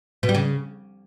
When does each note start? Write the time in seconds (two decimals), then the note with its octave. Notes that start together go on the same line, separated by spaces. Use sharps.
0.23 B2
0.29 G3
0.34 C#3